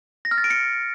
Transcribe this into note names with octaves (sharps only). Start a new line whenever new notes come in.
A#6
F6
A6
D7
C#7